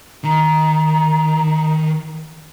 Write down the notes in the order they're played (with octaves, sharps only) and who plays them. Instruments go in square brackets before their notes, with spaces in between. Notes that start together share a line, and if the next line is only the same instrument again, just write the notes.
[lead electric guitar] D#3 [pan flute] A#5